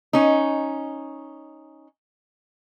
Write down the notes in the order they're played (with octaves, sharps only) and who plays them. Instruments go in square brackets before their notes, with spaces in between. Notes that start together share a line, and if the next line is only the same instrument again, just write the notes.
[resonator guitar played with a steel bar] C#4 D#4